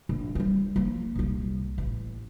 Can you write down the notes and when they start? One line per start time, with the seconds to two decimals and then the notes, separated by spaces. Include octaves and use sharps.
0.09 A#1
0.35 G3 C4
0.76 F3 A#3
1.16 C2 A#2
1.78 A1